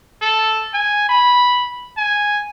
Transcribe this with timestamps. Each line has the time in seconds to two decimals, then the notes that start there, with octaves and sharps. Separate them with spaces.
0.22 A4
0.74 G#5
1.09 B5
1.97 G#5